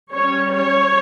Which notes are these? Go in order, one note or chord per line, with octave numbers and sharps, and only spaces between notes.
G3 C#4 C#5
C#5